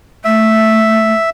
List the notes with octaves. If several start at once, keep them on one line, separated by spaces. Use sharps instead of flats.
A3 E5